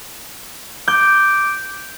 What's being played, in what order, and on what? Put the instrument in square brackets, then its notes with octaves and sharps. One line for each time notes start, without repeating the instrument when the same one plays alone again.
[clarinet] D6 [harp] G6